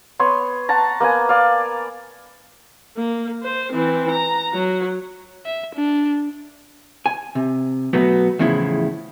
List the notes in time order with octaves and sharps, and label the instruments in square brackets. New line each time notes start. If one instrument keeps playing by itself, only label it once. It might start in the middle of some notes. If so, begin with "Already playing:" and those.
[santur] B3 C#5 C6
F#5 A5 A#5
A#3 B3 F#5 G#5
D5 F5
[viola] A#3
C5
E3 C4
A#5
F#3
[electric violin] E5
D4
[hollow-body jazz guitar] G#5
C3
B2 F#3 A3 B3
E2 A2 C#3 F3 E4